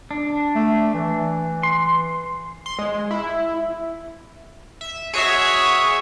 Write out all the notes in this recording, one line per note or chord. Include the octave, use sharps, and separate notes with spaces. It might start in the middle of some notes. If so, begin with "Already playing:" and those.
D4
A3
E3
C6
C6
G#3
E4
E5
F#4 G#4 C#5 E5